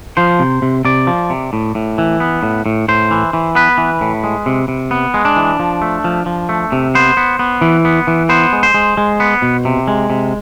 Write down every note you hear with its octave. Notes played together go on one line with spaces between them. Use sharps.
F3 C5
C3
C3
C3 D5
F3
C3
A2
A2
E3
B3
A2
A2
A2 C5
E3
E3
B3 B4
E3
A2
G#3
C3
C3
B3
G#3
D4
E3
F3
A3
F3
F3
A3
C3
B3 C5
B3
B3
E3
B3
E3
B3 C5
G#3
C5
G#3
G#3
B3
B2
C3
G#3
C3